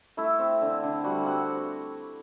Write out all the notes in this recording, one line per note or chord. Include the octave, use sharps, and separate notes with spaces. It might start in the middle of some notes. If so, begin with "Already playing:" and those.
A3 E4 E5
C4
D3
D3
G3 F#4 F#5
C4 F#4 F#5